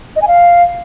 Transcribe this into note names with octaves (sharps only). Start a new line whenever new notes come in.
D#5
G#5
F5